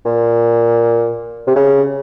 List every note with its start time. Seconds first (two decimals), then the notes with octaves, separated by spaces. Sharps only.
0.05 A#2
1.47 C3
1.56 C#3